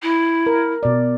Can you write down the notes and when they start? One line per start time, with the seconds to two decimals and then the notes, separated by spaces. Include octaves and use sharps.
0.02 E4
0.47 A#4
0.83 B2 D5